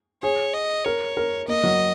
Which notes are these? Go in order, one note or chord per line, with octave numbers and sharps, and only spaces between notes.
G#4 C#5
D#5
A#4 C#5
A#4
A#3 D#5
F#3